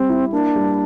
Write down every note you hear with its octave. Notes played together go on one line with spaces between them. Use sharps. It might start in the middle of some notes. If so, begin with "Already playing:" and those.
Already playing: G3 C4 G4
E4
A#3 D4
G3